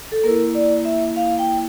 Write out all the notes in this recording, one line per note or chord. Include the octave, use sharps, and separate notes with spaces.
A4
A#3 E4 A#4
D5
E5
F5
G5